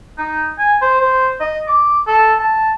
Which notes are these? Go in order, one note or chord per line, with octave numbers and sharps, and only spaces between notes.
D#4
G#5
C5
C5
D#5
D6
A4
A5